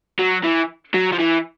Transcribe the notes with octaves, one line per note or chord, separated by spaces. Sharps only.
F#3
E3
F#3
F3
E3